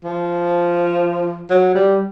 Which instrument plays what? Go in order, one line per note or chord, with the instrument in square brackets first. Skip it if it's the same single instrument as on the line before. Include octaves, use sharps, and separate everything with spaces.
[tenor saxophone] F3
F#3
G3